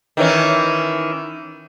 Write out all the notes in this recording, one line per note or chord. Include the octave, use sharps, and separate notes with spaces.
D#3 E3 C#4